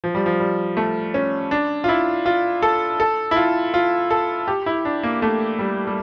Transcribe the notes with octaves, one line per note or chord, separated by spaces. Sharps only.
F3
G3
F3
G3
A3
C#4
D4
F4
E4
F4
A4
A4
E4
F4
F4
A4
G4
E4
D4
A#3
A3
G3
G3